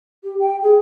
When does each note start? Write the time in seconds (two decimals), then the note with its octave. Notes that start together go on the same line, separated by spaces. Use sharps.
0.23 G4
0.39 G5
0.62 G#4